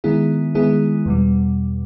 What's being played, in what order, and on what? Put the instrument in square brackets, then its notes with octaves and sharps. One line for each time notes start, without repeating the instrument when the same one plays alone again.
[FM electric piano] D#3 G#3 B3 E4 G#4
D#3 G#3 B3 E4 G#4
E2 B2 G3